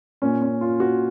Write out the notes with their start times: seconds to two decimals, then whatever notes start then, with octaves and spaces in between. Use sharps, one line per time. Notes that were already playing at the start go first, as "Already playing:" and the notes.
0.22 A#2 C#4
0.42 C#4
0.61 F4
0.80 F#4